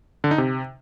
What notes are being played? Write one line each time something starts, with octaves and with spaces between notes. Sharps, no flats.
D3
D#4
C3